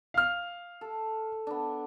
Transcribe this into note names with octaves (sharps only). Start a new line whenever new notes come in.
F5 F6
A4
B3 D4